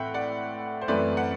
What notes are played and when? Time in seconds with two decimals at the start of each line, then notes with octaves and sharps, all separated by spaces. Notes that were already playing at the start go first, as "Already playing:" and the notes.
Already playing: A2 E3 C4 E5 F#5 G5
0.14 D5 F#5
0.82 C5
0.88 F#2 E3 A3 C4 B4 D5
1.17 F#5